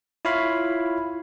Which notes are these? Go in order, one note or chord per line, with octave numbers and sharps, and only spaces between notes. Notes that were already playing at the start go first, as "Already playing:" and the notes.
E4 F4 C#5 F5 B5